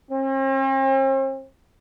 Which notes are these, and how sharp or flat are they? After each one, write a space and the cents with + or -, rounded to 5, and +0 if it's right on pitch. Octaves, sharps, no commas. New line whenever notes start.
C4 +45